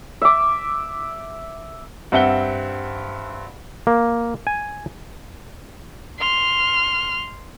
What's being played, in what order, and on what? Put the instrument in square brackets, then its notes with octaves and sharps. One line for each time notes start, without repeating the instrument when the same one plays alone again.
[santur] E5 D6
[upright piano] G2 C4 E5 F#5 G7
[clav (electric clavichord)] A#3
G#5
[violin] C6 F6